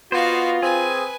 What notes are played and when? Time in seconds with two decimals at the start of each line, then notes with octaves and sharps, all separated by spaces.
0.12 B3 F4 F#4 C5 D#5 F5
0.62 C4 G#4 B4 G#5